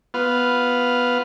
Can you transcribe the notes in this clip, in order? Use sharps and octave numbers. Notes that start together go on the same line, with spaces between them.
B3 F4 B4 F6